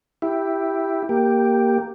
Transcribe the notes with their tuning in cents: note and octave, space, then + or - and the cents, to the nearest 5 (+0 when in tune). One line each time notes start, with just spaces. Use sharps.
E4 +0 G4 +0
A#3 +0 G4 +0